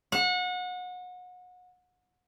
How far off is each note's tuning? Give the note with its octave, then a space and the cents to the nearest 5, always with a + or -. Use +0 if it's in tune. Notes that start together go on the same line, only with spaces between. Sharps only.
F#5 -30